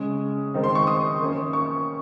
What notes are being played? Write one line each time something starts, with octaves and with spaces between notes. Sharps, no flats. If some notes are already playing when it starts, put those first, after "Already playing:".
Already playing: C#3 G#3 C#4 D#6
D#3 G#3 C4 D#4
C6
C#6
D#6
D#3 A#3 C#4
C#6